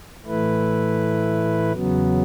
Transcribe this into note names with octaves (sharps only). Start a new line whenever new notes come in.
A2 E3 A3 E4 B4
E2 C#3 F#3 B3